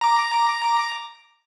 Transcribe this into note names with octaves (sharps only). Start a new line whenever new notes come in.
A#5 D6